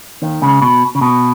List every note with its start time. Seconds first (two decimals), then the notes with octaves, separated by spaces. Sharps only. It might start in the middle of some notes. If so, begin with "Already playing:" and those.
0.22 D#2 D#3
0.42 C#2 C#3
0.62 B2
0.95 C#3
1.01 B2